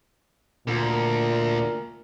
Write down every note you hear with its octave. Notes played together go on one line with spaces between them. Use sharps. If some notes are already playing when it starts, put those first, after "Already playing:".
D2 A#2 A#4